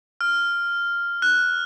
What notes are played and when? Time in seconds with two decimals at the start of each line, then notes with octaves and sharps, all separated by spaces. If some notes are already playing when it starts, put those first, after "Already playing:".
0.21 F6
1.22 F#6